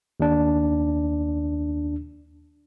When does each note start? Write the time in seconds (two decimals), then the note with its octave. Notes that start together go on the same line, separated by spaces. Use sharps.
0.20 D#2 D4